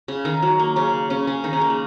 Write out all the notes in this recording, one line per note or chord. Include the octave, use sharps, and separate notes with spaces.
C#3
D#3
F#3
A#3
C#3 C#4
C#3 C#4
C#3 C#4
D#3 D#4
C#3 C#4
A#3
G#3